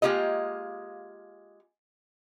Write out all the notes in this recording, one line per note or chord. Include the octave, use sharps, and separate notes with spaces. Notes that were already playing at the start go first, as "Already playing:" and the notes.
G#3 A#3 F4 G4 D#5